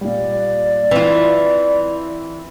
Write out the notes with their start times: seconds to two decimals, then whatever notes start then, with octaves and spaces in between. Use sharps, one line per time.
0.01 A#2 G3 D5
0.91 E3 C4 E4 F4